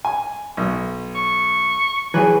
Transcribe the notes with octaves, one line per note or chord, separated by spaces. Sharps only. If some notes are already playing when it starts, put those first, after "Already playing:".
G#5
B1
C#6
E3 F#3 G#4 B4